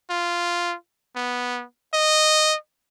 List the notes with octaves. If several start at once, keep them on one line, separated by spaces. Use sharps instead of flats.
F4
B3
D#5